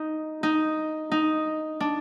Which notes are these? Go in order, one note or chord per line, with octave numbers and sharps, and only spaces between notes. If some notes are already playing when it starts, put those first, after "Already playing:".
Already playing: D#4
D#4
D#4
D4